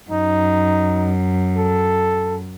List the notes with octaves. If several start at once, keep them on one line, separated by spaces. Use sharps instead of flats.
F#2 D#4
A4